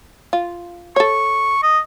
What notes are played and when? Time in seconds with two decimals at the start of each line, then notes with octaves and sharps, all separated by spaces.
0.33 F4
0.96 A4 C#5 C#6
1.63 D#5